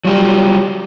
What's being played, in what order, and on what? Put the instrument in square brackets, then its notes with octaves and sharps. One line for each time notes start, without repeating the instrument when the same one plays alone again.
[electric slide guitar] F#3 G3 F4 G4